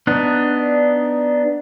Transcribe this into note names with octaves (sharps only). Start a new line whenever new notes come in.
B3 D4 D#4 F#6